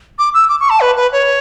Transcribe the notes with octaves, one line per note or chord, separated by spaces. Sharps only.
D6
E6
D6
C#6
A5
B4
B4
C#5